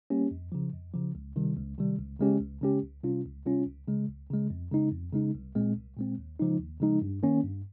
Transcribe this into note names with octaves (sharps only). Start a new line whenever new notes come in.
G3 A#3 C#4 G4
F2
C#3 F3
F2
C#3 F3
C#2
C3 D#3 G3
C#2
C3 D#3 G3
C#2
C#3 G#3 C#4 G4
C#2
C#3 G#3 C#4 G4
C#2
C3 G3 C#4 F4
C#2
C3 G3 C#4 F4
C#2
C#3 G#3
C#2
C#3 G#3
F2
C#3 G#3 D#4
F2
C#3 G#3 D#4
C2
A#2 G#3 C4
C2
A#2 G#3 C4
D#2
C#3 F3 G#3 D#4
D#2
C#3 F3 G#3 D#4
G2
D#3 A#3 C#4
G2